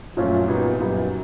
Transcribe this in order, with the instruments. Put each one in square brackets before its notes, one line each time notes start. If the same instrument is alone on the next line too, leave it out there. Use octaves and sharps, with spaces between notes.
[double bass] F#2 [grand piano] A#2 F3 A3 C#4 F4
[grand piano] A#2 G3 B3 D#4
[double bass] F#2 [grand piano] A#2 G3 B3 D#4